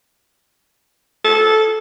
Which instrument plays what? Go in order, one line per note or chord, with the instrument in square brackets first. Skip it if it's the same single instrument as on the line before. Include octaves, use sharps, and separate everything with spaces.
[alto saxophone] A4